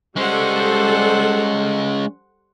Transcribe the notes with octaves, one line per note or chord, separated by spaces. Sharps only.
G3 G#3 C#4 A4 C5 F#5